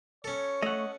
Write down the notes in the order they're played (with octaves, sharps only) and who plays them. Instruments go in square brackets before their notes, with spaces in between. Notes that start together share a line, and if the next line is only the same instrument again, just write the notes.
[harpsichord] C#4 A4 [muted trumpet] C#5
[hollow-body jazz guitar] A3 [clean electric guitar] D#5 F#5